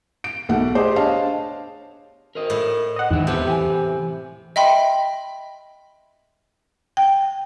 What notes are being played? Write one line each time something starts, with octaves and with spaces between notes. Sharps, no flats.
D7
B1 A3 F#5
G4 G#4 C5 D#5
D4 C#5 D#5 F5 A5
A#4 C5 D#5
A2
D#5 F#5
E2 G#2 D#3 E4
C3 A3 B3 B4
E3 G4 G#5
D#5 E5 G5 B5 C6
G5